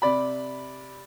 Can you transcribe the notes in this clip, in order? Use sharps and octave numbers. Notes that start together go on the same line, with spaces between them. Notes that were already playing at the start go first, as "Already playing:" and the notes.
C3 D5 B5